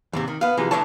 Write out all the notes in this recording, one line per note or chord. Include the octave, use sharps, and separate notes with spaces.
D#2 G#2 C3
D#3
B3 F5
C3 E3 F3 G#3
D2 A2 E3 D4 C#5 A5